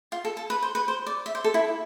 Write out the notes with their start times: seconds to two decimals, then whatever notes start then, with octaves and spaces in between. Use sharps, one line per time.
0.12 F4
0.25 A4
0.37 A4
0.50 B4
0.63 C5
0.75 B4
0.88 C5
1.06 D5
1.26 E5
1.35 C5
1.44 A4
1.54 E4